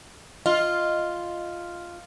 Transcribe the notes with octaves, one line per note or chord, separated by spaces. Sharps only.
F4 D#5